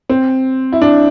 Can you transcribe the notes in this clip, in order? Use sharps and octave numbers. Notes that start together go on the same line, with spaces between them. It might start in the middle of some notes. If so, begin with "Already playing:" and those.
C4
E4
D4